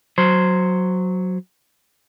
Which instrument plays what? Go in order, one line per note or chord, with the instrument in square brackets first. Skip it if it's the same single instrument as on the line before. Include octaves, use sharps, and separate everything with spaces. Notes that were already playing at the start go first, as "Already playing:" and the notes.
[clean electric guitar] F#3 C5